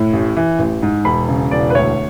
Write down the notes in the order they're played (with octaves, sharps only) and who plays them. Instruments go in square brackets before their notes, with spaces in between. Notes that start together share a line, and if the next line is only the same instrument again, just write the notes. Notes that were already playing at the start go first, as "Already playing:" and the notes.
Already playing: [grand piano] A2
A1
E3
A1
G#2
E1 B5
C#3
E1 D5
B4
D2 C#5